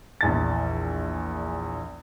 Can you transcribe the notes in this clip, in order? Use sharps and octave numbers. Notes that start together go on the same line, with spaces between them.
A#1 E2 A6